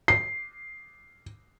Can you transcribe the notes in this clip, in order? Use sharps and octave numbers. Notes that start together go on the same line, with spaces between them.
C7